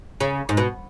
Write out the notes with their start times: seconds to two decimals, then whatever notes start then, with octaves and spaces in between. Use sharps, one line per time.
0.20 C#3
0.49 G#2
0.57 B2